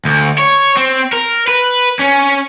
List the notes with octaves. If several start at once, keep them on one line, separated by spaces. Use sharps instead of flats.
D2
C#5
C4
A#4
B4
C#4